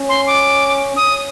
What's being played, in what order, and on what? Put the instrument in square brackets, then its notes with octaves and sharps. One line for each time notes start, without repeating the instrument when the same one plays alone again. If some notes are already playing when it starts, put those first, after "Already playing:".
Already playing: [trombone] C#4
[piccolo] C6
D6
[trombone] C#4 [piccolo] D#6